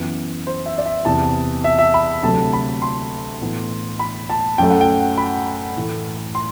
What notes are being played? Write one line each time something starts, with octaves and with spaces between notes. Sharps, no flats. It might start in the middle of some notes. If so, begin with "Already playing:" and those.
Already playing: F#2 E3 B3
C5
E5
D5
E5
E2 C3 E3 B3 A5
E5
E5
B5
D2 C3 F#3 A3 A5
B5
C6
A2 E3 B3
B5
A5
F#2 F#3 A3 G5
F#5
G5
B5
A2 E3 A3
C6